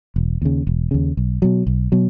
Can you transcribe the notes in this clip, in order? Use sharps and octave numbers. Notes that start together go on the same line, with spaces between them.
E1
D#2 C#3
E1
D#2 C#3
B1
B2 F#3
B1
B2 F#3